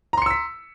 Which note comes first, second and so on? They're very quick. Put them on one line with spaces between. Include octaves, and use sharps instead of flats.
A#5 C6 C#7 E6 B6